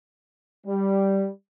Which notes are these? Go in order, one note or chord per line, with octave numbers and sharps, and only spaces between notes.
G3